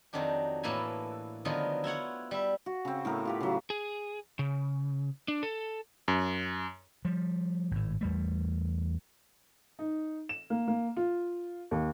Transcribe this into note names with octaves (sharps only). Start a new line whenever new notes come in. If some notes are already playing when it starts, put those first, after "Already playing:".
F2 D#3 F#3 D4 G4
A2 E3 A#3 A4 B4 G#5
D3 D#3 F3 F#3 B3 F4
E4 F4 C#5 F#5
G3 E5
F#4
C#3 C4
A2 B3 A#4
F4 G4 B4
C#3 F#3
G#4
C#3
D4
A4
F#2
F3 G3
G#1 A2
E2 G3 A3
D#4
E7
A#3
A#3
F4
D#2